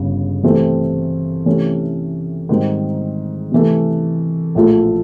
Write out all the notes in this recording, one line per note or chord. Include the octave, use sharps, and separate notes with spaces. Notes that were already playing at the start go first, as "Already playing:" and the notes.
Already playing: G1 C#3
C3 E3 A3 C4 E4
C3 E3 A3 C#4
G#2 D#3 G3 C4 D#4
C3 E3 A3
A#1 A2 F3 A3